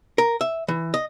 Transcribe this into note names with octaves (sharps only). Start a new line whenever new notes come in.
A#4
E5
E3
D#5